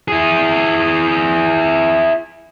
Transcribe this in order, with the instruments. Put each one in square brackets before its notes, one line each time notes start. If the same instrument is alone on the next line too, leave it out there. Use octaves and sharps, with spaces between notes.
[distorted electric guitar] E4 G#4